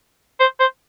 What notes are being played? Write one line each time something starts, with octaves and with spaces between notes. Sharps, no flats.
C5
C5